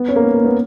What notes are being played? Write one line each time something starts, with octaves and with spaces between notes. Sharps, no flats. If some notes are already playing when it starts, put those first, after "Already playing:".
Already playing: B3
C#4
A#3
B3
A#3
B3